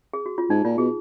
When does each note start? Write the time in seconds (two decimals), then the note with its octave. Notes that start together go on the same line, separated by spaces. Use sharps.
0.13 G#4
0.26 F#4
0.38 F4
0.50 G#2 D#4
0.64 A#2 F4
0.78 B2 G#4